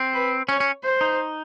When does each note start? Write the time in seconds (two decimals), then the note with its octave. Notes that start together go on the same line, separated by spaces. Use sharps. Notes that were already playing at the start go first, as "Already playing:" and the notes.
Already playing: C4
0.14 B4
0.49 C#4 C#5
0.60 C#4
0.83 C5
1.01 D#4